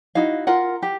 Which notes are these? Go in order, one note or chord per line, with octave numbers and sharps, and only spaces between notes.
D#4 E4 F#4 F5
F4 A#4 F#5
G4